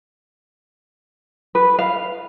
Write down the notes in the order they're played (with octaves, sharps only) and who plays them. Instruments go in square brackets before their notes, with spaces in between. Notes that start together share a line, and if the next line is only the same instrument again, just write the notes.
[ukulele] B4
F5